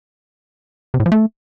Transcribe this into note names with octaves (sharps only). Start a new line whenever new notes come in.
C3
A2
F3
A3